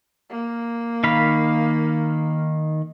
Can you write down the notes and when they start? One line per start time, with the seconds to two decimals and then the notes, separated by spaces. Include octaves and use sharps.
0.30 A#3
1.04 D#3 F5 B5